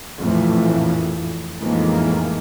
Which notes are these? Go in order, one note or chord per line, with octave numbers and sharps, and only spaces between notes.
A#1 F2 A2 E3 A3
F2 A2 D#3 E3 G#3 A#3